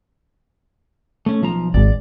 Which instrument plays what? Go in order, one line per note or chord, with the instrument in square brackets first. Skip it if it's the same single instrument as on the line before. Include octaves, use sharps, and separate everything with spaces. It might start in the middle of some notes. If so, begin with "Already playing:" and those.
[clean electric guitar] A3 C#4
B1 F3 A#5
[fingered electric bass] G#1 G#2 [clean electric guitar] D5